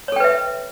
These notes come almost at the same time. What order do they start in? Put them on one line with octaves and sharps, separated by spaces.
C#5 A4 G5 B4 E5